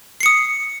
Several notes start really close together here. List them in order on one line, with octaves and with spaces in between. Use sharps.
C7 C#7 D#6